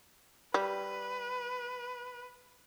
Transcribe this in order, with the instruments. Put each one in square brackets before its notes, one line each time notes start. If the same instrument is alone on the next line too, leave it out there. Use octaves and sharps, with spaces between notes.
[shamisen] G3 [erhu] B4